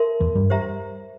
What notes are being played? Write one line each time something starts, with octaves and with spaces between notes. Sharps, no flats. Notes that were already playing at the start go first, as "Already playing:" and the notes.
Already playing: A#4 E5 A5 C6
E2 E3
G2 G3
G4 C5 E5 A#5